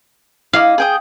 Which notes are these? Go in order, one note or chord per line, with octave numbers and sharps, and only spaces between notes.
E4 D#5 F5 D6
G#4 G5 D#6